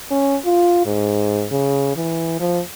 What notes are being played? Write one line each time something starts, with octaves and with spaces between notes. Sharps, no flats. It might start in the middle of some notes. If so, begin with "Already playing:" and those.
C#4
F4
G#2
C#3
E3
F3